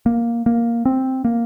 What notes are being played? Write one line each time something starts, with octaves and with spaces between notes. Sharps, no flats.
A#3
A#3
C4
A#3